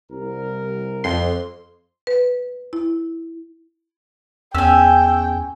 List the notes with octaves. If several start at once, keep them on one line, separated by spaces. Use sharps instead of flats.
C2 A#4
F2 C6
B4
E4
E2 C#4 G5 G#5 E6